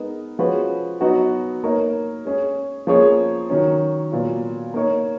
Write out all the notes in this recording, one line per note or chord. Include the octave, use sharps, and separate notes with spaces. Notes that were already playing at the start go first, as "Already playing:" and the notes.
Already playing: G#3 B3 D#4 A#4
F3 G#3 C#4 F#4 B4
F#3 B3 D#4 F#4
A#3 D#4 A#4 C#5
G#3 C#4 G#4
F3 A#3 C#4 G#4 C#5
D#3 F#3 C#4
A#2 F#3 B3 F4
A#3 D#4 A#4 C#5